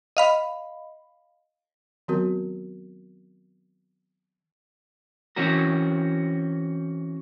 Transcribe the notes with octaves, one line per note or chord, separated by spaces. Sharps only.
D#5 F5 B5
D#3 F#3 B3 C4 F#4 A#4
E3 C4 C#4 F#4 A#4